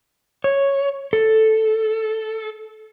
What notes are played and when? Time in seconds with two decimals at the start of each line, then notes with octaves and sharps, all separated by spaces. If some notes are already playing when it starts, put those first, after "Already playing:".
0.44 C#5
1.13 A4